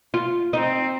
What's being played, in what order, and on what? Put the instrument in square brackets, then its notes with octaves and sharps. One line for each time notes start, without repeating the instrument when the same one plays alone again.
[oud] F4
[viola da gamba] C4 [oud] D#4